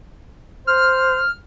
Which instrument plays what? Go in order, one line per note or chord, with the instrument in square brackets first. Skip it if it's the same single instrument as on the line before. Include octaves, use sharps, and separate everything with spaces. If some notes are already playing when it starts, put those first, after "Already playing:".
[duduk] C5 [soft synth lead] F6